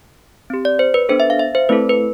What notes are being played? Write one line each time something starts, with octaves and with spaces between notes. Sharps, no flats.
C4 G4
D5
C5
B4
B3 D4 A4 C5
E5
F5
E5
C5
A3 C4 E4 A4 B4
B4